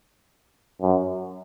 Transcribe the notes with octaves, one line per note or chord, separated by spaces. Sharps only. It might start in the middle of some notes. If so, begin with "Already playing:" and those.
F#2